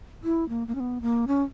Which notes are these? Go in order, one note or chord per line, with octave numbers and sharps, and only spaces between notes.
E4
A#3
A#3
C#4
B3
A#3
C#4